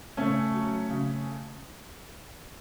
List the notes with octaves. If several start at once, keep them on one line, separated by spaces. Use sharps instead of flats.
C#3 A3 C#4
F#3
C#3